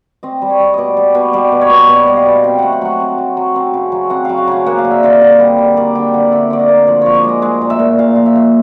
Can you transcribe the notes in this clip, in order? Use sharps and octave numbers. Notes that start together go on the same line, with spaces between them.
C4 D#5
G3
C#5
G3
B2 D5 D#5
G3
B2
G3 D5
B2
C#5
B2
D#5
B2 D5
G3 D#5
F5
B2
C4 G5
A3 F#5
G5
F#3 F#5
C4
F#3
F#3
C4
C#3
F#3
C4 F#5
F#3 F5
F5
C#3 F#5
A#3 F#5
F5
D3
E5
D3 F5
D3 D#5
G3
D3
A#3 D5
D3 G5
D3 F#5
D3 E5
D3 D5
D#5
A#3
F3 D5
F3 C#5
D5
G#3 D#5
G#3
A#2
E5
A#2
A#2 F5
F3 F5
E5
F3